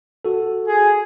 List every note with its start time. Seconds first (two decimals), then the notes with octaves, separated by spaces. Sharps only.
0.25 F#4 A4
0.67 G#4